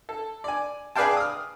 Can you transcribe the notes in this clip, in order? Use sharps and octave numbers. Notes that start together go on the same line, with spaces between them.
A4
D5 G#5
G#4 B4 D5 F5 G5 A5
D#6 F6